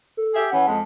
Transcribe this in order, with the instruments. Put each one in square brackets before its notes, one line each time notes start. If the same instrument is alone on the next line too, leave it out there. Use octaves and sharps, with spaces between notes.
[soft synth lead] A4
[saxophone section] G4 G#4 E5
[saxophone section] E3 C#4 [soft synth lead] F#5
[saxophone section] F2 G#3 [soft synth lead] A5